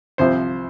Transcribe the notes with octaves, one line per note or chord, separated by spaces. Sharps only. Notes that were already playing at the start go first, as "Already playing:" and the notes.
C2 C3 F3 C5